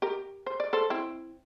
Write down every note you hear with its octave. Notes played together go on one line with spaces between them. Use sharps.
G4 A#4
C5
D5
A4 C5
C4 E4